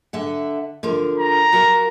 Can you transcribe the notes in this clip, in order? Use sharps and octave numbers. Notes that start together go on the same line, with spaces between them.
D3 E5 F#5
D3 F3 A#4
A#5
F#4 A#4 F5